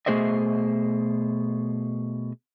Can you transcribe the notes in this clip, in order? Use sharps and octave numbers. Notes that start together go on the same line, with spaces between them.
B2 A3 G#4 C5 D#5 E5